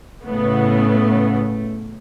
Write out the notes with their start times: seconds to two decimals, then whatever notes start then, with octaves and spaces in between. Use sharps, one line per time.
0.25 A2 C#3 A3 B3